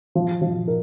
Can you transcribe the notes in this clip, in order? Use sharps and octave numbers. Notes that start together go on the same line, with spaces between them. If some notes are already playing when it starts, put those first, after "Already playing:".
F3
F3
A#4